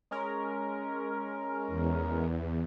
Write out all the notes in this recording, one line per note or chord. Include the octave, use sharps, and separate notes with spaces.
G#3 C#4 A#4
E2